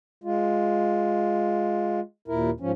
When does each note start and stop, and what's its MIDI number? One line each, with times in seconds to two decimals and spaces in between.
0.24 2.00 56
0.24 2.00 65
2.28 2.50 39
2.28 2.50 46
2.28 2.50 64
2.28 2.50 70
2.60 2.72 44
2.60 2.72 53
2.60 2.72 61